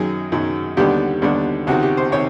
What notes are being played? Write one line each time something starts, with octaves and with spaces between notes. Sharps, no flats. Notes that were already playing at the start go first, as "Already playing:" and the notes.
Already playing: F#2 D#3 F#3 G#4
F#2 D#3 F#3
D#2 D3 G3 B3 D4 G4
D#2 D3 G3 B3 D4
C#2 C3 D#3 F#4
G4
C5
C3 D#3 C#5